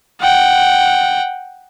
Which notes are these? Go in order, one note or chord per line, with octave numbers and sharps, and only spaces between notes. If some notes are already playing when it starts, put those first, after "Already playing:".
F#5 G5